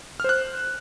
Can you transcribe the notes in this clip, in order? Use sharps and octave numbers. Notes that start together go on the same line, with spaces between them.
C5 F6 F#6